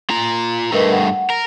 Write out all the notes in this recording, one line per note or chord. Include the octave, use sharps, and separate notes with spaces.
F4 A#5
G2 A3 A#4 B4 D#5
F#5
A#4